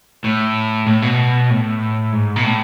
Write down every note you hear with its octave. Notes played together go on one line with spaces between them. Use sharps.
A2
A2
B2
A2
G#2
B2
A2